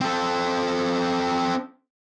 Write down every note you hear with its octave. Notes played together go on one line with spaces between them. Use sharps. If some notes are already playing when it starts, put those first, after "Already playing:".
C4 A4